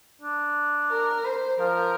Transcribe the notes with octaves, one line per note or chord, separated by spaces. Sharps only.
D4
A#4
C5
F3 A#4